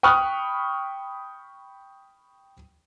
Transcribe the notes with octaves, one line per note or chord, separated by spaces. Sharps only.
G5 B5 C#6 D#6 F6 F#6